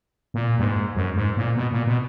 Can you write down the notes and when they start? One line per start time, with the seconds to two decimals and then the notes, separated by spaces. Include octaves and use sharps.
0.34 A#2
0.59 G2
0.64 G#2
0.95 F#2
1.16 G#2
1.37 A#2
1.56 B2
1.72 A#2
1.87 B2